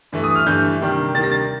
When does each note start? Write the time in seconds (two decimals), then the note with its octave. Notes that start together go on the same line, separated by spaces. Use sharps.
0.12 G2 E3 A3
0.24 D#6
0.36 F6
0.46 G2 E3 A3 G6
0.81 C3 D#3 G3 A#3 D4
1.14 C3 D#3 G3 A#3 D4 A6
1.23 A#6
1.31 A6